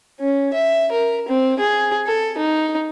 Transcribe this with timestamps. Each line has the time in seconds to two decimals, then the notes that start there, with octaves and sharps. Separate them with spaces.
0.20 C#4
0.53 E5
0.92 A#4
1.28 C4
1.60 G#4
2.07 A4
2.38 D#4